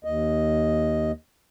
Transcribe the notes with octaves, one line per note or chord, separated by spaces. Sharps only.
D#2 D#5